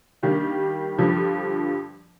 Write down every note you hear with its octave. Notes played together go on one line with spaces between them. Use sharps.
D#3 G3 A#3 D4
G2 D3 F3